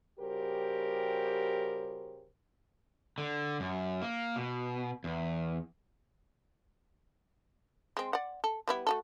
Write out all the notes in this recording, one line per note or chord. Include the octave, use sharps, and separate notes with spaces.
C#3 G3 F#4 G4 A#4 C5
D3
F#2
A#3
B2
E2
G#3 C4
D5 F#5
A4
G3 B3 E4
A3 F#4 A4